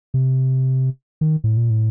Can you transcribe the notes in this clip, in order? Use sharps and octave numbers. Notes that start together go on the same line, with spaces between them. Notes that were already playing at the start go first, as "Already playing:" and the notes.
C3
D#3
A2
A#2
A2